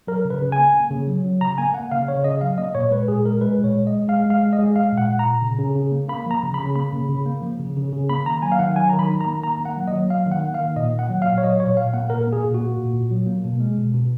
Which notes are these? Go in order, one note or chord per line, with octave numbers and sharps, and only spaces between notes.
F#3 A#4
C#3
B4
C#3
G#5
A#3
A#3
C#3
F#3
F#3
C#3 A#5
A#3 G#5
A#3 F#5
C#3 F5
C#3 C#5
C#3 D#5
F#3 F5
A#3 D#5
A#2 C#5
G#3 B4
A#2 G#4
G#3 A#4
G#3 B4
A#2
C#5
G#3
D#5
G#3
G#3 F5
G#3 F5
G#3
D#5
G#3
G#3 F5
A#2
F#5
A#2
A#5
A#2
C#3
C#3
C#3
A#3
A#3 B5
F3 A#5
C#3
B5
C#3
A#3 B5
C#3
C#3
A#3
F3
C#3
C#3
C#3
A#3 B5
D#3 A#5
F#3 G#5
F5
D#3 F#5
F#3 G#5
D#3 A#5
B5
D#3
A#5
A#3
D#3 A#5
A#3
F#5
F#3
D#5
F#3
A#3 F5
D#3
F#5
A#3
F5
D#3
A#2 D#5
A#3
F#5
F#3
F5
A#2
C#5
F#3 D#5
A#2 C#5
A#2 F5
A#3 F#5
A#2 A#4
A#3
G#4
A#2
F#4
A#3
A#2
A#2
F#3
A#3
B2
G#3
B2
B2